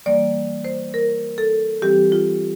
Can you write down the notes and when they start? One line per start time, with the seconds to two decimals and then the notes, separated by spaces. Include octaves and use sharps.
0.06 E3 G3 A#3 D5
0.64 C5
0.94 A#4
1.38 A4
1.82 E3 G3 C4 G4
2.12 F4